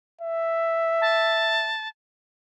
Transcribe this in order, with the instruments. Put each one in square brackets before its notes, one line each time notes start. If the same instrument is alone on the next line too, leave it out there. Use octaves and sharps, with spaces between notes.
[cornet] E5
[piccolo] A5